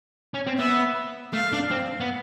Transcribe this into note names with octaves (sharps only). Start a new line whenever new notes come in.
C#4
C4
B3 E5
A3 F5
D4
C4
B3